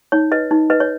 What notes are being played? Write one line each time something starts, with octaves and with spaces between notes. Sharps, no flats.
D#4 C#5
B4 D#5
D#4
B4 D#5
C#5